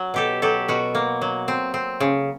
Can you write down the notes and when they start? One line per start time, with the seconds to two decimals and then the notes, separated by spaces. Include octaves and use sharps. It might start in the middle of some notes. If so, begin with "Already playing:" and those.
Already playing: F#3
0.14 B2 G4 A4
0.42 F#3 G4 A4
0.68 B2 F#4
0.95 A#3
1.21 F#3
1.48 C4
1.74 C4
2.00 C#3